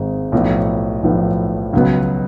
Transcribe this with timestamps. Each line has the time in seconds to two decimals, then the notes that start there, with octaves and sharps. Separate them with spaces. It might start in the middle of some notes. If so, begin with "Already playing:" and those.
Already playing: G#1 G#2 G#3
0.32 B1 A2 F3 B3
1.03 B1 A2 F3 B3
1.73 C#2 B2 F#3 B3